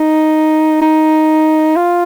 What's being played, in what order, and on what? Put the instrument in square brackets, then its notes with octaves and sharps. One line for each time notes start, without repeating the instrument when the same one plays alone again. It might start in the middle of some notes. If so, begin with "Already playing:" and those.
Already playing: [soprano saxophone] D#4
D#4
F4